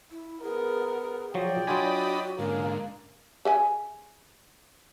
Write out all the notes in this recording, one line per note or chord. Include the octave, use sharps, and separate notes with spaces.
E4
B3 G#4 A#4
F3 F#3 D5 G5
F#3 D4 F4 F#4 D#5 G#5 B5
G#2 D3 A#3 C#4
G#4 E5 G#5